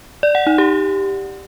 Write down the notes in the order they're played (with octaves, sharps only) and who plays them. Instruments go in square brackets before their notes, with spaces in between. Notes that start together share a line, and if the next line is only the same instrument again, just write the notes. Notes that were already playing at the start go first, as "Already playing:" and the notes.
[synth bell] D5
F#5
D#4
G4